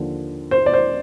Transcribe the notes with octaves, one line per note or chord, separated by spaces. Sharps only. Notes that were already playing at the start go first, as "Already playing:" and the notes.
Already playing: D#2 D3 F3
C5
D5
C5